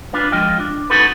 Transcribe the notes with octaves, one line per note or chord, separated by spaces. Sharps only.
D4 F4 B4 F5
F3 G#3 F4 D#5 G5
D4
C#4 D#4 F#4 A4 B4